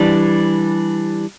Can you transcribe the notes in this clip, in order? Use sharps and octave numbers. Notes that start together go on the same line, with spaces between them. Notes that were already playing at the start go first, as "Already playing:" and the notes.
Already playing: E3 G3 D4